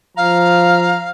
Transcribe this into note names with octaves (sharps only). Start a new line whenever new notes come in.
F3 F5 A#5